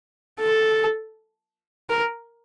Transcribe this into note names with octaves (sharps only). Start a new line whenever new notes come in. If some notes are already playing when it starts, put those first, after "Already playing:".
A4
A#4